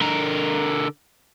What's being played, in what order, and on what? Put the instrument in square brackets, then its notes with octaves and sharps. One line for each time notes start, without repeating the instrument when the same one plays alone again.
[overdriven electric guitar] D3 A#4